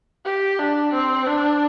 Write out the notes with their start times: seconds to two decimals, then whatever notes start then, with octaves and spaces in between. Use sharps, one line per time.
0.25 G4
0.59 D4
0.93 C4
1.27 D4